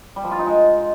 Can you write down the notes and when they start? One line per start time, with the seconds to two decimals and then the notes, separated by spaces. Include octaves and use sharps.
0.16 G3
0.24 F3
0.31 F4
0.39 D#4
0.46 G#3